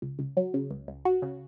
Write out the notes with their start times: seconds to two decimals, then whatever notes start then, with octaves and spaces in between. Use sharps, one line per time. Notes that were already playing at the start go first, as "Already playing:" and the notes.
0.02 C#2
0.19 C#2
0.37 F#3
0.54 C#3
0.71 C#2
0.88 C#2
1.05 F#4
1.22 C#3